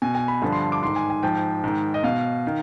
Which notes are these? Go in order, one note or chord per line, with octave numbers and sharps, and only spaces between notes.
B2 G#5
G#5
B5
G2 D3 F3 B5
C6
D6
G#2 D#3 C6
G#5
G#5
G#2 F3 G5
G#2 D#3
D#5
B2 F5
D#3